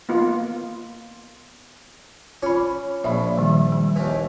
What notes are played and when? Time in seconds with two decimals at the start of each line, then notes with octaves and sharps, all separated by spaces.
0.09 A#3 B3 F4
2.43 C#4 F4 B5
3.04 A#1 E5 B5
3.38 D#3 G3
3.72 G3
3.96 D#2 E3